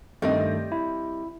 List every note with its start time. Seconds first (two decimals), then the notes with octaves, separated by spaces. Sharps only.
0.22 G2 D#3 G3 A3 C4 D#5
0.72 E4